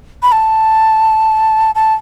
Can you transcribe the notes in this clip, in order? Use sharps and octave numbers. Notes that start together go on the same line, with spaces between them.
B5
A5
A5